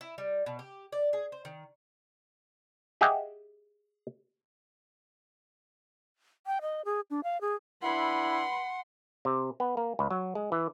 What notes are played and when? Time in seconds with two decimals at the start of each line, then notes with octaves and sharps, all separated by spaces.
0.01 E4
0.18 G3
0.46 B2
0.59 G4
0.92 D5
1.13 G#4
1.32 C5
1.45 D#3
3.01 G4 G#4 D#5 E5 F#5 G5
6.47 G5
6.62 D#5
6.85 G#4
7.10 D4
7.24 F5
7.41 G#4
7.82 D4 E4 B4 F#5 B5 C6
9.25 C3
9.60 B3
9.77 A#3
9.99 C#2
10.11 F#3
10.35 G#3
10.52 E3